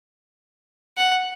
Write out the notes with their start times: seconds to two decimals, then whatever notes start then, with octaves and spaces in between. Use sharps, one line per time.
0.97 F#5